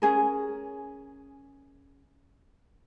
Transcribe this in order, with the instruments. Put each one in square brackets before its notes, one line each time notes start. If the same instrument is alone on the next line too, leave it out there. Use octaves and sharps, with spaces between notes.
[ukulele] C#4 G#4 A#4